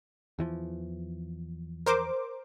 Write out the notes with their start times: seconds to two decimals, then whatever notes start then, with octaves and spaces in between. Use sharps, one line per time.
0.39 E2 E3 F3
1.86 A#4 C5 D6